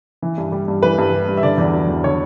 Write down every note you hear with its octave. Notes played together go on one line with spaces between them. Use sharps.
E3
G2
G3
G2
E3 B4
G2
G3
G2
E5
D3 D5
E2
F#3
E2
D3 C#5